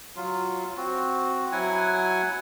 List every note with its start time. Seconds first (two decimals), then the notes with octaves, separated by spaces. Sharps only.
0.16 F#3 F4
0.77 C4 F#4
1.52 F#3 E4 F#5 G#5